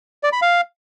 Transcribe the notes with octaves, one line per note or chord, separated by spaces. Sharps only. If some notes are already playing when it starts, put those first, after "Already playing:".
D5
B5
F5